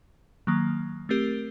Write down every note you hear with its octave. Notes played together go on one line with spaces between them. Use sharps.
D#3 F#3 A#3
A3 C4 G4 A#4